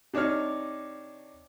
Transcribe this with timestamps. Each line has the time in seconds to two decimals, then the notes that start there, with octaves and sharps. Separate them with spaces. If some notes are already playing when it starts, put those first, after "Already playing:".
0.14 C3 D4 D#4 C#5 F6